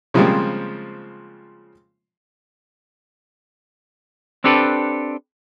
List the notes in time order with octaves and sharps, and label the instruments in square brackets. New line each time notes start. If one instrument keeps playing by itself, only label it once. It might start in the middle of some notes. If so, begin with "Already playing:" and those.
[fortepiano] C#3 F3 G3 G#3 A#3 C4
[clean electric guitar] C4 D4 G4 A4 B4